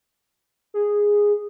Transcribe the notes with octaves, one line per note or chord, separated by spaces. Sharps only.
G#4